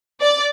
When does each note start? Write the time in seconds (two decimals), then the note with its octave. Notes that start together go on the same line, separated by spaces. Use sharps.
0.21 D5